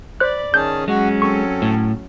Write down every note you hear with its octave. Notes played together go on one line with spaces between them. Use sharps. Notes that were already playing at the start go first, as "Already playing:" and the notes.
C5 D5 B5 F#6
D#3 C#4 G#4 A5 G6
F#3 G#3 C#4 F#4
C4 A4 C#6
A2